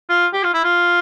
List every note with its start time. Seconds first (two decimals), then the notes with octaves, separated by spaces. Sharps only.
0.09 F4
0.33 G4
0.43 F4
0.54 E4
0.63 F4